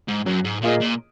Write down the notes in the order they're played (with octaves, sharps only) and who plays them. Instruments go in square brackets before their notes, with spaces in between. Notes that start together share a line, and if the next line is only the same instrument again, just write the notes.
[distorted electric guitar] G#2
[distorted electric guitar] F#2 [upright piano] F#3
[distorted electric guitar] G#2
[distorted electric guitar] A#2 [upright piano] A#3 F4 G#4 D#5
[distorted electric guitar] A#2